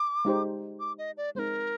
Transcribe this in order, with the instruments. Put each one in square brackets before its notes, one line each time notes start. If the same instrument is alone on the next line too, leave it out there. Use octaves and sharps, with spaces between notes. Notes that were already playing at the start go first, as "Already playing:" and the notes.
Already playing: [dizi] D6
[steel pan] G#3 D#4 G4 C5
[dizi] D6
D#5
D5
[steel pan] G#3 C4 D#4 [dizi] A#4 C5